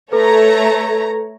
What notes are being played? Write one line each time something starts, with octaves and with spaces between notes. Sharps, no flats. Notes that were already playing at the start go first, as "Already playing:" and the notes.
A3 A4 B4 C#5 A#5